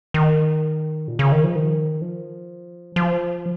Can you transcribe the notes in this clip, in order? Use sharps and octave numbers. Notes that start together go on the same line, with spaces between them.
D#3
A#2
C#3
D#3
F3
D#3
F3
F3